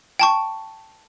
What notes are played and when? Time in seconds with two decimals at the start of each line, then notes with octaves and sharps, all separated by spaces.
0.19 G5 A5 C#6